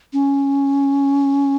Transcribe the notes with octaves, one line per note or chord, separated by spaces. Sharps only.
C#4